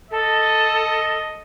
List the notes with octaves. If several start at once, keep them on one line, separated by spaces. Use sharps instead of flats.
A4 D#5